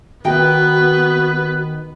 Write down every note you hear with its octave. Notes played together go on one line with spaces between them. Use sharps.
D#3 B3 F#4 B4 G5